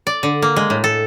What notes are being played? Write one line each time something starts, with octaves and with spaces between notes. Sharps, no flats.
D5
D3
A#3
G#3
A2
A4